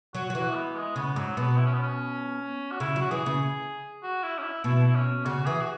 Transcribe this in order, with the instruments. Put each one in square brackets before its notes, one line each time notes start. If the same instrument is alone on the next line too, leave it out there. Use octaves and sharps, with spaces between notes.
[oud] F#3 [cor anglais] F#4
[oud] F#3
[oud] E3 [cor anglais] F#4
[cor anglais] G#3
B3
G#3
[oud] C#3 [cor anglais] B3
[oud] G#2 [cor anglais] F#3
[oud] B2 [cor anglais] B3
[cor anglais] E4
C#4
B3
C#4
F#4
[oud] C#3 [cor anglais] E4
[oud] F#3
[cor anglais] F#4
[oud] E3 [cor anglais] G#4
[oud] C#3
[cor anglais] F#4
E4
C#4
E4
[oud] B2 [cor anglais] E4
[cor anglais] E4
C#4
[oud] C#3 [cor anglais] F#4
[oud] E3 [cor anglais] G#4
[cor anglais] F#4